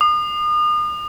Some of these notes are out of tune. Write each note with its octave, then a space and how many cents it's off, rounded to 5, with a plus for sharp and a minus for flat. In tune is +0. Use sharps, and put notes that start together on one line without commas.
D#6 -40